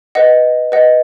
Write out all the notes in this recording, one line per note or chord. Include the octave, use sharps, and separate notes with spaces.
B4 D#5 F#5
B4 D#5 F#5